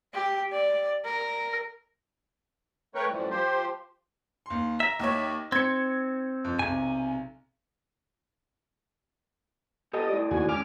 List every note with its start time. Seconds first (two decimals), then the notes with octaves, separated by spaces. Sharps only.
0.13 G4
0.52 D5
1.05 A#4
2.95 A3 A#4 B4 C#5 G5 C#6
3.09 F#2 A2 E3 F3 G3
3.30 F3 G4 C5
4.46 D#2 C6
4.80 E5 A#5 A#6
4.99 D#2 D#4 C#5
5.52 C4 G#6 C#7
6.45 F2
6.59 B1 C3 G#5
9.94 B3 G4 A4 D#5
10.09 A2 D5
10.31 D#2 F#4 G#5
10.49 C#2 C#3 G#5 D6 F6